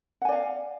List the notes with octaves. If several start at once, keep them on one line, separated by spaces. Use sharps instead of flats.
D5 F5 F#5 G#5